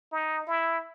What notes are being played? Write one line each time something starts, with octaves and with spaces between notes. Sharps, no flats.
D#4
E4